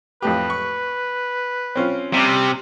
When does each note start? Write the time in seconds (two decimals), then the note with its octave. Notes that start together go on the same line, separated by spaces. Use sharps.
0.22 F2 A2 G4 B4
0.50 C#6
1.75 C4 C#4 F4
2.13 C3 G3